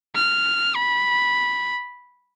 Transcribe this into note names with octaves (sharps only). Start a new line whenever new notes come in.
F6
B5